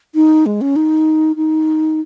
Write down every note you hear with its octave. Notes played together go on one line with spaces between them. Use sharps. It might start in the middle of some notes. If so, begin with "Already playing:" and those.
D#4
G#3
C#4
D#4
D#4